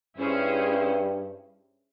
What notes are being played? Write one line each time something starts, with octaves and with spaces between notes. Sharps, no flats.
G2 C#4 E4 G#4 C5